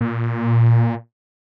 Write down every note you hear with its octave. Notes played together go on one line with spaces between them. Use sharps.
A#2